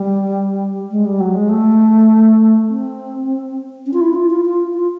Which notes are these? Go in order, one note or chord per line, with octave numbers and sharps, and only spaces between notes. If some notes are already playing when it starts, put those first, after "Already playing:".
Already playing: G3
G#3
G3
F#3
G#3
A3
C4
C#4
F4
E4
F4
F4
F4
F4